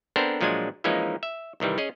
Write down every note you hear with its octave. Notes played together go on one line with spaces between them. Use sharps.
B3 C4 D4 A4 A#4 C5
A#2 F3 F#3 G#3 D4 G#5
E3 F3 G#3 A#3 C#4 D#4
E5
C2 D#3 E3 G3
C#4 G#4 D#5